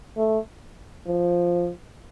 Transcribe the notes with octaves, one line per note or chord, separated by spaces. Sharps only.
A3
F3